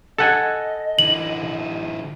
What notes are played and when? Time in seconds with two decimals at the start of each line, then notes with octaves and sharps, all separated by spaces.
0.18 A4 D#5 F#5 G#5
0.99 D3 E3 F#7